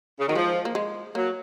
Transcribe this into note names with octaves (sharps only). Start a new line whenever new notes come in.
C#3
D#3 F#3
F3 G#3
A#3
G#3
F#3 A#3